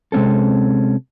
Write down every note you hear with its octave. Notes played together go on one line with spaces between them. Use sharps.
C3 G#3 C4 C#4 A4